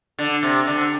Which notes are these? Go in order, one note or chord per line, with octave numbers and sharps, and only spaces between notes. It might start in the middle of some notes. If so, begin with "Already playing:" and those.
D3
C3
D3